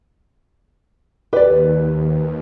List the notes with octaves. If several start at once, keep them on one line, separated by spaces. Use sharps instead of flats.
D#2 G4 B4 D5